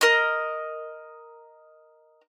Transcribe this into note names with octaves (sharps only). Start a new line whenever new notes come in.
A#4 D#5